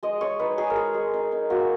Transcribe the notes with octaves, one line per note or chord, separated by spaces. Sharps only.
G#3 D#5
G#3 C#5
D#4 B4
D#4 G#4
A#4
G#3 G#4
G#3
D#4
D#4
A#3 F#4